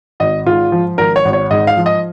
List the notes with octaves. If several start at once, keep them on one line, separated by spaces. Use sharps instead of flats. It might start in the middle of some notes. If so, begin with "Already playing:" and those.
G#1 D#5
G#2 F4
F3
G#1 A#4
C#5
G#1
C#5
G#2 D#5
F5
F3
D#5